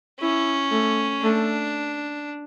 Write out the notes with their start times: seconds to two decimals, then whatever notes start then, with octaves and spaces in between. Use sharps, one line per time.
0.20 C#4 E4
0.71 A3
1.22 A3 D4